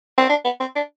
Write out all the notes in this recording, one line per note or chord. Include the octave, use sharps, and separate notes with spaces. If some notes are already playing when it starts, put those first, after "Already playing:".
C4
D4
B3
C4
D4